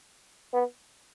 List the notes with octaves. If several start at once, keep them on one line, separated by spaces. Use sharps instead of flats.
B3